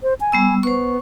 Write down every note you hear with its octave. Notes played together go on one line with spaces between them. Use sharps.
C5
G#5
G3 B3 E6
B3 C5 C#6